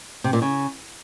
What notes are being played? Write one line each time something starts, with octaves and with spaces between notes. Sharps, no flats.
C3
A#2
C#3